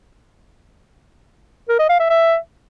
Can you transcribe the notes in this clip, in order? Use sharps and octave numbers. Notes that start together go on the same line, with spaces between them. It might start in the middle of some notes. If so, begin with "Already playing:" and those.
A#4
D#5
F5
E5
E5